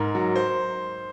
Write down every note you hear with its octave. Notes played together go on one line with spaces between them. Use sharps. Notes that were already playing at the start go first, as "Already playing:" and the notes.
Already playing: G#2 A#4
F#3
C5